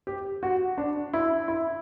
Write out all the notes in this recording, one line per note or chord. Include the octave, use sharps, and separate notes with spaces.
G4
F#4
D4
E4
E4